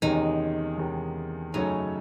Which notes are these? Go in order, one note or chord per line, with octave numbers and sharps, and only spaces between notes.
E2 C3 D#3 G#3 C#4 D#4
E2 C3 D#3 G#3 C#4
F#2 C#3 F#3 A3 C#4 D#4